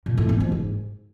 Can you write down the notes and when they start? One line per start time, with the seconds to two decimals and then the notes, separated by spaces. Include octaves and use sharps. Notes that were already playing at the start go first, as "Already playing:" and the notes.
0.06 A#2
0.17 A2
0.29 B3
0.40 F3
0.52 G#2